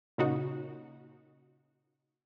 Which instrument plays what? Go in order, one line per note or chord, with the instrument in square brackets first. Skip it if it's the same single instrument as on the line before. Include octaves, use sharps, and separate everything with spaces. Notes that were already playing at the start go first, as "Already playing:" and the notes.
[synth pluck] A#2 C#3 D#4 F#4